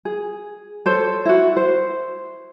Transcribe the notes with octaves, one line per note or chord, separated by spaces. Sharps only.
G#4
A4 C5 C#5
E4 F#4
C5